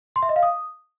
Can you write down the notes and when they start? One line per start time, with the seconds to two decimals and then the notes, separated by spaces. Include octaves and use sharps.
0.16 C6
0.22 E5
0.29 D#5
0.36 F5
0.43 D#6